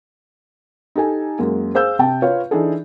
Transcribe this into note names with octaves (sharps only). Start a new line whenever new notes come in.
D#4 G4 A4 G#5
F#2 G#3 A#3
G#4 C5 F5 E6 G6
C3 G5 A5
F4 B4 C#5 F5
E3 D4 D#4 G#4 A4